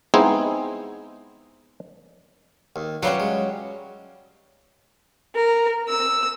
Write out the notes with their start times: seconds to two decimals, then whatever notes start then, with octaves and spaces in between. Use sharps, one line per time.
0.14 G#3 B3 C4 D#4 E4 G#4
2.76 D#2
3.02 F#3 G3 C#4 F4 B4 F5
3.20 G#3
5.36 A#4
5.89 E6